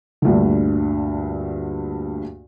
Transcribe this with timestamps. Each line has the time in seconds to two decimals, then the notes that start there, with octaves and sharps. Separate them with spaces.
0.22 D2 G2 A#2 D3